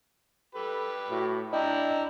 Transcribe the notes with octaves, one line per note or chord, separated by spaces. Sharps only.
G4 A4 B4
A2 F#4
D4 E4 D#5 G5 A#5